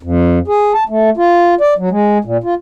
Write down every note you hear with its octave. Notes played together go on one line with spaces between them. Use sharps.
F2
G#4
A5
A3
F4
D5
F#3
G#3
A#2
F4